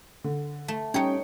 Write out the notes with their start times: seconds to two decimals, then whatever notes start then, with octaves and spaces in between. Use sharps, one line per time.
0.24 D3
0.68 A3
0.94 G3 C#4 D#4 C#5 G5 C#7